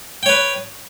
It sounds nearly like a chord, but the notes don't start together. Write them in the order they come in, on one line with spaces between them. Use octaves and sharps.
G5 C#5 B4